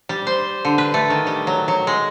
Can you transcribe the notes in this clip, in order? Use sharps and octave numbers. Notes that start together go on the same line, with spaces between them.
G3
C5
D3
B4
A3
D#3
G3
F#3
F#3
G#3